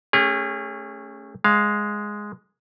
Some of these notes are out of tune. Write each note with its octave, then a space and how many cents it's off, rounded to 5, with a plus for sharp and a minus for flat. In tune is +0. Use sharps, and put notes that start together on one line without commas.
A3 +0 C#4 +0 G#4 -40
G#3 +0 F5 +0